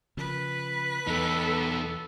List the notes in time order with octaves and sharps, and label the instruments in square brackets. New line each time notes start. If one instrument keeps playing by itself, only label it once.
[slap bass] C#3 F3 [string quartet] B4
[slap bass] E2 [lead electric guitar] B3 D#4 [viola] A4 A5